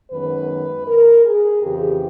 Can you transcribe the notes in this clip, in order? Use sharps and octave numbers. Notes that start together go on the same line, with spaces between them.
F#2 D#3 G#3 B3 B4
A#4
G#4
F2 C#3 E3 G4